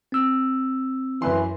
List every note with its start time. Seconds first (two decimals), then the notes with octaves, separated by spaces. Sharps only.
0.12 C4 E6
1.22 F#2 E3 B4 C6